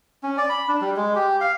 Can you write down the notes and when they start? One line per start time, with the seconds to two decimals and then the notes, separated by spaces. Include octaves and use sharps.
0.23 C#4
0.38 D5
0.49 B5
0.68 D4
0.81 G3
0.96 G#3
1.15 G4
1.41 F5